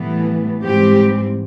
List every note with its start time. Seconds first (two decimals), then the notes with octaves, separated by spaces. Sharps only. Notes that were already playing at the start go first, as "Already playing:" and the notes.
Already playing: A2 E3 G3 B3
0.62 G#2 E3 G3 C4 G4